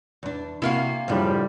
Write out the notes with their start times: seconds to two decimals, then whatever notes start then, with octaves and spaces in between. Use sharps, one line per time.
0.23 E2 D4
0.62 C3 A#3 E4 F#4 F5
1.08 F#2 A2 C#3 F3 G3 D4